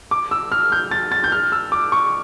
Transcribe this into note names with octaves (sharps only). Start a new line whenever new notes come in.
D6
E6
F6
G6
A6
A6
G6
F6
E6
D6
C#6